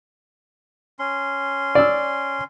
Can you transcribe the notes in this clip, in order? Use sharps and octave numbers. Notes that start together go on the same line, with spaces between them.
C#4 C6
D5 E6